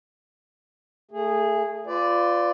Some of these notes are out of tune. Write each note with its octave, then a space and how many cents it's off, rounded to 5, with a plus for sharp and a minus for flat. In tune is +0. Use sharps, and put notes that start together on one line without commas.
A3 +20 G#4 -10
F4 +0 B4 +40 D5 +0